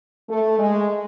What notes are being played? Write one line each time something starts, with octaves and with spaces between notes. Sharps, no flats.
A3
G#3